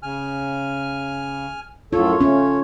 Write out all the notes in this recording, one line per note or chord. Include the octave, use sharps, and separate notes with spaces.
C#3 G#5 F6
F#2 A2 F4 A4 C#5
A3 C#4